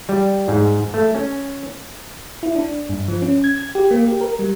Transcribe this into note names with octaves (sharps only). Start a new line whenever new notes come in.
G3
G#2
A3
C#4
E4
D4
G2
F3
C#4
G#6
G#6
G4
A#3
G4
A#4
G3